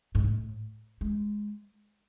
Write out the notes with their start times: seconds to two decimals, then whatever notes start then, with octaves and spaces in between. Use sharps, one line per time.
0.15 G#2
0.24 A2
1.01 G#3